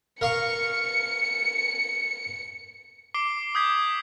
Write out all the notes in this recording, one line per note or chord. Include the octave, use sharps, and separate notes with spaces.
A#4 F5 C#6 C#7
D6 C7 D7 G7
D#6 E6 G6 G#6 B6